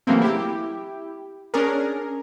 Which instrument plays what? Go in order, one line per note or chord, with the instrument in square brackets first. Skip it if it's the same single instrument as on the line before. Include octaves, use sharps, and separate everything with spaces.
[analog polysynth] C#3 E3 F#3 A3 A#3 C4
E4 G4
C#4 D4 G#4 A#4